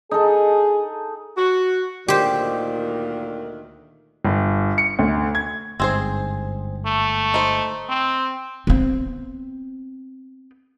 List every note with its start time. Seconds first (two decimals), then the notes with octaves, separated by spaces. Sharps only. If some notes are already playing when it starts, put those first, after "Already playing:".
0.11 D#4 G#4 A4
1.37 F#4
2.08 D2 A#2 D#3 G4 C5
4.25 G1
4.78 C#7
4.99 D2
5.35 G#6
5.80 G1 G#2 C4 G#4 C5
6.85 A3
7.34 D#4 C5
7.89 C4
8.67 B3 C4